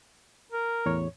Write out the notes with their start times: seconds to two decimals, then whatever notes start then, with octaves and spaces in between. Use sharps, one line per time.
0.52 A#4
0.86 E2 A2 C#5